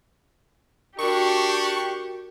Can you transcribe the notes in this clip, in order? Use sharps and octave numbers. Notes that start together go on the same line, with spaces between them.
D4 F#4 G4 A#4 C#6